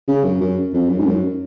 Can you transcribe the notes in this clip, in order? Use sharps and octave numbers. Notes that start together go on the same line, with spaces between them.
C#3
F#2
F#2
F2
F#2
G#2
F#2